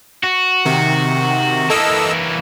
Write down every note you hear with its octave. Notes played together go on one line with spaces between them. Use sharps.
F#4
C3 D#3
E3 A#3 A4 D#5 E6